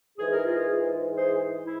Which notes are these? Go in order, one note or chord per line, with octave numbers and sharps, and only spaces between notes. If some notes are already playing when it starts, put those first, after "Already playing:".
G#2 E3 G#4
A#4
F4 G#4
G#4 C5
E4